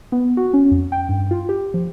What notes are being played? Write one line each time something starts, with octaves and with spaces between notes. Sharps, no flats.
B3
F#4
C#4
F2
G5
G2
F4
G4
F3